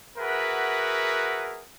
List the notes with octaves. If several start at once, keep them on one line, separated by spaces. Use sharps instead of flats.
F#4 G#4 A#4 B4 E5 F#5